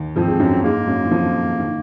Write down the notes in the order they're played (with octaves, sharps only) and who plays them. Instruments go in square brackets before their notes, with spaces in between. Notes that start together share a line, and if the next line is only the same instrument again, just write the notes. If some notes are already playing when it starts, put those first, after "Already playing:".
Already playing: [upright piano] D#2 D#3
[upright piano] F2 F3 [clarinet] C4
[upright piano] G#3
F#2 F#3
[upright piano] G#2 G#3 [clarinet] A#3
[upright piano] F#2 F#3
D#3
F2 F3
D#3